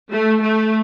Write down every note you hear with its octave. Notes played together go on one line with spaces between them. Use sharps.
A3
A3